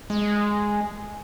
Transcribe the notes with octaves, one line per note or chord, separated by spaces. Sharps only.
G#3